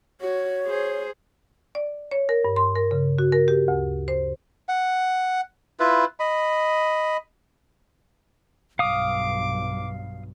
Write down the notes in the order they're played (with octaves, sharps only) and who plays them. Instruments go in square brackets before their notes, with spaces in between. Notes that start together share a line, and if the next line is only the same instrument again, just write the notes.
[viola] F#4 [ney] C#5
[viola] G#4 C5
[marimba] D5
C#5
A#4
G2
C6
A#4
C#3
F#4
A#4
G4
D2
C5
[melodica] F#5
E4 F4 B4
D#5 B5
[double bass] B1 G2 [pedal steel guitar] F5 D#6 [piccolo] D6